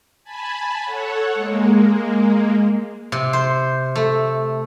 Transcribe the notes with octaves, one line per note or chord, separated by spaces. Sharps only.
G#5 A5 B5
A4 C#5 F#5
G#3 A#3
C3
C5
A3